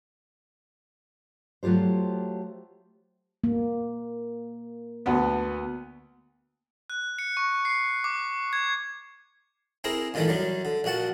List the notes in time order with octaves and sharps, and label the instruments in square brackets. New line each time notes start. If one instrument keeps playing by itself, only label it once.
[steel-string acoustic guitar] F#3 A3 F4 G4 C5
[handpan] A#3
[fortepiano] D2 B3
[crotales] F#6
C#7
C#6
C7
D6
G#6
[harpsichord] C4 E4 G#4 A#4
G2 A#2 D#3 E3 G3 A3
F#2 F#3 G3
D3
A#1 A#2 F#4 F#5 A5